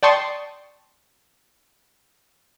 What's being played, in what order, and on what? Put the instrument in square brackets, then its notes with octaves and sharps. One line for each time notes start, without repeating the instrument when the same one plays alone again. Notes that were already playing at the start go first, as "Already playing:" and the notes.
[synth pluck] D5 G5 A5 C6 C#6 D#6